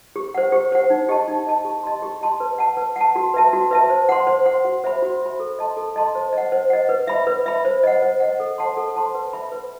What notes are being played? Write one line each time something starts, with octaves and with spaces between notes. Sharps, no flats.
G4
C5 F#5
G4
C5 F#5
D#4
G4 D#5 A5
D#4
G4 D#5 A5
G4
D#5 A5 C6
G4
D#5 A5 C6
B4
F#5 A5
B4
F#5 A5
F#4
B4 E5 A5
F#4
B4 E5 A5
C5
F#5 C6
C5
F#5 C6
F#4
C5 E5 B5
F#4
C5 E5 B5
A4
D#5 A5 C6
A4
D#5 A5 C6
C5
D#5 F#5
C5
D#5 F#5
B4
E5 B5
B4
E5 B5
C5
D#5 F#5
C5
D#5 F#5
A4
C5 F#5 A5 C6
A4
C5 F#5 A5 C6
B4
E5 B5
B4